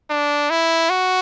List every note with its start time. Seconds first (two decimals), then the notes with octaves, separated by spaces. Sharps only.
0.10 D4
0.50 E4
0.90 F#4